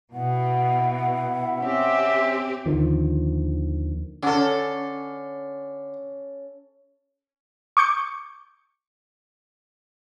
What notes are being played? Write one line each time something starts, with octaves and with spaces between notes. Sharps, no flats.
B2 E4 F#5
C4 C#4 G4 E5
D#2 D3 D#3 F3
D3 C#4 A4
C#6 D6 G6 C#7